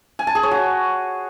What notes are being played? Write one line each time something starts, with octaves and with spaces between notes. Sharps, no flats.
G#5
A5
G#4
C#5
F#4